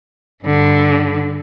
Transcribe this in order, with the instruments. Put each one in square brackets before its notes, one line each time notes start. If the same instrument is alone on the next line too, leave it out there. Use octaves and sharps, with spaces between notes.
[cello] G2 D3